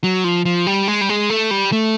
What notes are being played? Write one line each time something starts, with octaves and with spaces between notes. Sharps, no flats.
F#3
F3
F3
G3
G#3
G3
G#3
A3
G3
A3